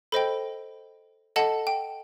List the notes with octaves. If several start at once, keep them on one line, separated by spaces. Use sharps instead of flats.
A4 C5 D#5 G5 B5
A4 D#5 F#5 A5
G5